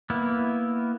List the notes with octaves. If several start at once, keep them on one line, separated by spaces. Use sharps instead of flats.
A#3 B3 E4